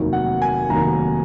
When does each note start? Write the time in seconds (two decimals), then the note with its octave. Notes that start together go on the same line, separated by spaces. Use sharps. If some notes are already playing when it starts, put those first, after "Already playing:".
Already playing: F1 D#2 D#3 F#3
0.13 F#5
0.42 G#5
0.70 F1 D#2 D#3 F#3 A#5